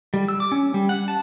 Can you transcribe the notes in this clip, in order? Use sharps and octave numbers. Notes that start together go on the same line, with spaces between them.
G3
E6
D6
C#4
G3
F#5
A5